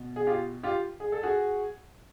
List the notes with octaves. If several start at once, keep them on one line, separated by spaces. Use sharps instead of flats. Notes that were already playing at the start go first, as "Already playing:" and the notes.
Already playing: B2
G#4
F4 G4
F4 G4
G#4
A4
F#4 G#4